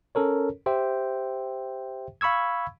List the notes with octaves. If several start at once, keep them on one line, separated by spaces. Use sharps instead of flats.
C#4 A4 A#4 C#5
G4 C5 E5 G5
F5 B5 C#6 E6 G#6